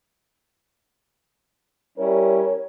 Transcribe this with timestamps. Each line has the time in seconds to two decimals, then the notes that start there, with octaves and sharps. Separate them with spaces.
1.98 G3 C#4 E4 A#4 C#5